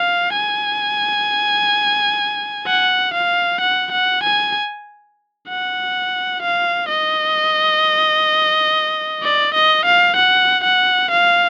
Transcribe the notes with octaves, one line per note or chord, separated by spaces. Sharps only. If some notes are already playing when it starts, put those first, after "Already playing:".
Already playing: F5
G#5
F#5
F5
F#5
F#5
G#5
F#5
F5
D#5
D5
D#5
F5
F#5
F#5
F5